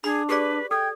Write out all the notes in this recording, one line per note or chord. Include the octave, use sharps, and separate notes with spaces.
D4 G#4 B5
G4 G#4 B4 D5
A4 G5 G#6